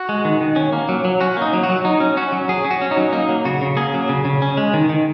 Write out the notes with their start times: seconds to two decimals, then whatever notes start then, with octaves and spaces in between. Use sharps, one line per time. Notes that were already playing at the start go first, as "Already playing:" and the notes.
Already playing: F#4
0.09 G#3
0.25 D#3
0.41 D#3
0.56 C#4
0.73 A#3
0.89 F#3
1.05 F#3
1.21 C#4 F#4
1.37 A#3
1.42 D#4
1.53 F#3
1.63 F#4
1.69 F#3
1.84 F#3 D#4
2.00 C#4
2.17 C#4 F#4
2.32 F#3
2.49 F#3 G#4
2.65 C#4
2.71 F#4
2.82 C#4
2.91 D#4
2.97 F#3
3.12 A#3 D#4
3.29 F#3
3.45 C#3 F#4
3.62 C#3
3.77 A#3 G#4
3.94 F#3
4.09 C#3
4.25 C#3
4.42 C#4
4.57 G#3
4.74 D#3
4.89 D#3